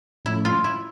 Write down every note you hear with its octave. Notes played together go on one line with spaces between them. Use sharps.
A2 F3 A3 C#4 E4
F4
E4